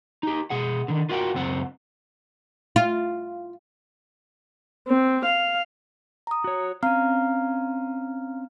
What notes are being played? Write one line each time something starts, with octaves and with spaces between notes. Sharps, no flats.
D#4 G4
B2 G#4 F#5
D3 D#3
F4 F#4 A#4 E5 F#5 G5
C#2 F#2 C4 F#5
F4
C4
F5
A#5 D#6
F#4 C#5
C4 C#4 F5 A#5 F6